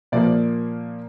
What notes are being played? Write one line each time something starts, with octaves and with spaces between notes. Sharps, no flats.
A#2 F3 A#3 D5